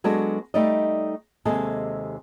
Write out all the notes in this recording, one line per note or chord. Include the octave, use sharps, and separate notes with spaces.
F#3 G#3 B3 D4 F#4 A4
G3 A3 D#4 D5 D#5
D#2 C3 G#3 G#4 A4